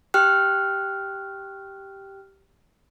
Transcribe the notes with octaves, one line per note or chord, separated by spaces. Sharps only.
G4 G5 F6 F#6